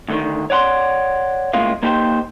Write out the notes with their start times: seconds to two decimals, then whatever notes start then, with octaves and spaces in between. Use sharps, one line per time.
0.09 D2 D3 D#3
0.50 C#5 D5 F#5 B5 C6
1.53 A2 C#3 G#3 A#3 F4
1.83 A#3 D#4 G4 G#4 C5 G5